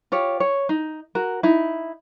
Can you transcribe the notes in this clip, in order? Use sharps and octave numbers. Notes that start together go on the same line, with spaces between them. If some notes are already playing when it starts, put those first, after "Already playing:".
F4 G4 C#5
C#5
D#4
F#4 A#4
D#4 E4